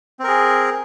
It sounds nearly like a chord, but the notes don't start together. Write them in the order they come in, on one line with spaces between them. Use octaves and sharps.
C4 A#4 G#4